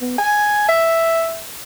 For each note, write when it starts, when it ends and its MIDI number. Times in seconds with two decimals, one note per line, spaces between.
0.01 0.13 59
0.18 0.64 80
0.69 1.38 76